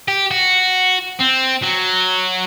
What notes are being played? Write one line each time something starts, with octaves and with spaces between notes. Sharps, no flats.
G4
F#4
C4
F#3